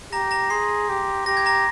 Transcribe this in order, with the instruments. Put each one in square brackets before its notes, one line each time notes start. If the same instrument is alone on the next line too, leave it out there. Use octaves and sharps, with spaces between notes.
[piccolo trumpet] G4 [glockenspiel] A#5 A#6
[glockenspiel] A#5 A#6
[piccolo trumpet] G#4 [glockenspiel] C6 C7
[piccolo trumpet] G4
[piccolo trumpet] G4 [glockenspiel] A#6
[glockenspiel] G#6
A#5 A#6